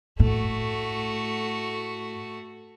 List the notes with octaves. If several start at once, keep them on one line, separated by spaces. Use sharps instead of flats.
A2 A3 F#4